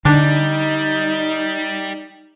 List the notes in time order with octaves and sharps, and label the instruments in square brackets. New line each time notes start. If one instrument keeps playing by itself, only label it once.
[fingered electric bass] D3 [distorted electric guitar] G3 [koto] D4 [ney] D#4